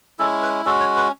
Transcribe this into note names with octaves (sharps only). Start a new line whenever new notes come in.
G#3 C#4 E4 A4
B4
G#3 C#4 F#4 A4
C#5
B4